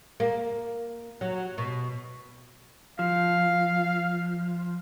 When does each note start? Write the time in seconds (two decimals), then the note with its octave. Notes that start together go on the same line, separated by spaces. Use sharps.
0.20 A#3
1.21 F#3
1.58 B2
2.99 F3 F5